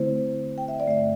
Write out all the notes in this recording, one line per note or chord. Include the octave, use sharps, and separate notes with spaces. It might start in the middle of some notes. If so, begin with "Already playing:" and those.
Already playing: D3 A3 C4 E4 C5
G5
E5
D5
G2 D3 A3 E5